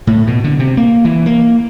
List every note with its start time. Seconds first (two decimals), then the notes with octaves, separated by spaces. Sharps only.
0.07 A2
0.27 B2
0.44 D3
0.59 C3
0.77 A#3
1.05 E3
1.26 A#3